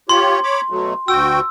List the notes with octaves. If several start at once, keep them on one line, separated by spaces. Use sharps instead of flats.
F4 G4 C#5 C6
C#5 B5 D6
B2 F#3 A3
D2 F#4 G5 E6